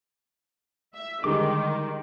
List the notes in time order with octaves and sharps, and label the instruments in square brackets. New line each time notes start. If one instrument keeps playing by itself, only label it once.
[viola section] E5
[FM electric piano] D3 G3 G#3 [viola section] D#3 [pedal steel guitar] C6 D6